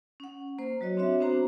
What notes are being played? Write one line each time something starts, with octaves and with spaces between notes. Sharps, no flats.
C#4 F#5
A#3 C5
F#3 F#4 C#5 D#5
C4 D4 F#4 C#5 E5
B3 C4 D4 F#4 C5 A#5